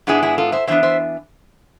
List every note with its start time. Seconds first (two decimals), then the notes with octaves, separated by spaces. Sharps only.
0.07 G#2 G#3 B3 D4 E4 G#4
0.23 E4 G#4
0.38 F4 A4
0.52 C5 E5
0.67 A2 E3 B3 D4 C5 E5
0.83 C5 E5